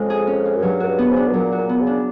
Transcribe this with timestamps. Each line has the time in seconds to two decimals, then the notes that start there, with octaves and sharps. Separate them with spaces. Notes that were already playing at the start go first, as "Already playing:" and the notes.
Already playing: F2 G#3 C#4 F4
0.10 G#4
0.27 C#4
0.45 F4
0.56 F#2
0.63 G2 F#3
0.80 F#2 F#4
0.87 G2
0.99 B3
1.11 G#2
1.16 D4
1.28 B2
1.34 A#2 F#3
1.52 F#4
1.58 A#2
1.69 B3
1.81 C#3
1.87 D4